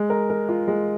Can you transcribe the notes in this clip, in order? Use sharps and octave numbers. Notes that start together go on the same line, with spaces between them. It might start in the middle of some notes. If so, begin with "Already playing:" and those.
Already playing: G#3
A#4
A#4
F4
G#3